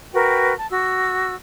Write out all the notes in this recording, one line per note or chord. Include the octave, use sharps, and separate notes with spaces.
F#4 A#4 B4 G5
A5
F#4 E6